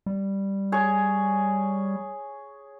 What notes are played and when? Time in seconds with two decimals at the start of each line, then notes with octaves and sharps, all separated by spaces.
0.06 G3
0.72 G#4 C#5